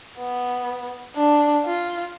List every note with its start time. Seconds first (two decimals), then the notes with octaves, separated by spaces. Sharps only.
0.19 B3
1.16 D4
1.65 F4